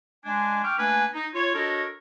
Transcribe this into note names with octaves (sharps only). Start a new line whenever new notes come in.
G#3 D4 G#5
G5 C#6 D6 F6
A3 A#3 D4 B4 G#5
D#4
F4 C#5
D4 F#4 A4 A#4 C#5 D#5